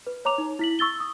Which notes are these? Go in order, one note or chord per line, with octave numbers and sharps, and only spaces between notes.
B4
C#5 A#5 D6 F7
D#4
E4 B6 F#7
C#6 E6 A6 G7
D#6